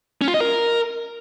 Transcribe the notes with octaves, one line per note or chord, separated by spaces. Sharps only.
C#4
F4
D#5
A#4